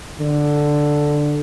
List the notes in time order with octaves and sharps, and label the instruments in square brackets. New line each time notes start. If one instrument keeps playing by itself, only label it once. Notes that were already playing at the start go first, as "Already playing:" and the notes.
[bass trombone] D3